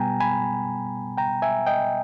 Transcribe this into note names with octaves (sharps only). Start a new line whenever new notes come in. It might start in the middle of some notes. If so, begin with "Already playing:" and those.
Already playing: B2 G3 B3 G5 G#5 A#5
G#5 B5
G5 A#5
E5 G#5
D#5 G5